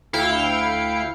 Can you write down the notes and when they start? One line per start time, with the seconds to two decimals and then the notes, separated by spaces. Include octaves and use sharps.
0.13 D2 E4 F5 G5 C#7